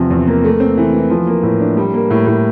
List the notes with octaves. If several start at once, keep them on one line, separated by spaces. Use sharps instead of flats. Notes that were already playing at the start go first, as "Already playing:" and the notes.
Already playing: E2 C3 F3
E2
A#3
A3
C4
E3
E3
F3
A#3
A2
D4
G3
A#3
A2
A2